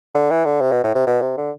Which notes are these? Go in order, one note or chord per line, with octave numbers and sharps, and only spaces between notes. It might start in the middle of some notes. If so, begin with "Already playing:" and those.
D3
E3
D3
C3
B2
A2
C3
B2
C3
D3